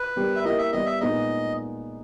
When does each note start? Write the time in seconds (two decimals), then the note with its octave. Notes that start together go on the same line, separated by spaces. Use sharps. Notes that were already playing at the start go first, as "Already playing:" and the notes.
Already playing: B4
0.16 G3 B3 G4 A#4
0.36 E5
0.44 A#3 E4 G4 A#4 D#5
0.58 E5
0.72 G3 B3 G4 D#5
0.86 E5
1.00 A#2 G#3 B3 D#4 D#5